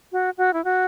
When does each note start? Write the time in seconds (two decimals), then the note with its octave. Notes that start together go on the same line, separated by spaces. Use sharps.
0.12 F#4
0.38 F#4
0.53 E4
0.64 F#4